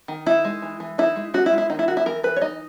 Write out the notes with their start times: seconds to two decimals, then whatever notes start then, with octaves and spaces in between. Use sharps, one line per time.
0.08 D#3
0.26 D#4 E4
0.45 G#3
0.62 E3
0.80 E3
0.98 D#4 E4
1.16 G#3
1.34 C#4 F#4
1.46 E4
1.52 G#3
1.58 E4
1.70 D#3 D#4
1.79 E4
1.88 D#3 F#4
1.97 E4
2.06 E3 A#4
2.23 E3 B4
2.36 C#5
2.42 D#4 D#5